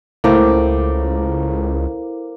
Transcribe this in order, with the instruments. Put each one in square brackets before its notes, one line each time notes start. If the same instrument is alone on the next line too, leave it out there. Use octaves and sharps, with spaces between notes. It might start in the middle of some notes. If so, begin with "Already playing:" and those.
[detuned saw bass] C#2 [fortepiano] A2 [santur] A#3 D6 [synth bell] E4 A4 C5